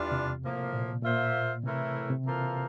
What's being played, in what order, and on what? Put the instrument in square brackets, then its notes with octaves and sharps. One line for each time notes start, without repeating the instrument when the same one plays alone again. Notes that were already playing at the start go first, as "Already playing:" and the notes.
Already playing: [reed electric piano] E2 [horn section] E3 G3 D4 F4
[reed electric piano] C3
[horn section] A2 F3 A#3
[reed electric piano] A#2
[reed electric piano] A#2 [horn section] A#3 F4 C5 E5
[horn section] A2 E3 A3 E4 A#4 [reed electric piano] C3
[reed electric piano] C3
[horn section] E3 A#3 F4 A4 C5